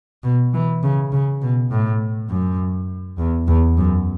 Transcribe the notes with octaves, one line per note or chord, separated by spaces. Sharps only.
B2
E3
C#3
C#3
B2
A2
F#2
E2
E2
F#2